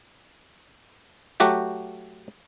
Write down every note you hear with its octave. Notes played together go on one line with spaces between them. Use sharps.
F#3 A3 F#4 G4 G5